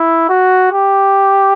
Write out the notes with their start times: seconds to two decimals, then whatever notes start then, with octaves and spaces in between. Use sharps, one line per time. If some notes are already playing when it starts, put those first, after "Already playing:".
Already playing: E4
0.29 F#4
0.72 G4